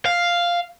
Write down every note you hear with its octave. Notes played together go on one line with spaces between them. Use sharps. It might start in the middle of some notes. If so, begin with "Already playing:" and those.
F5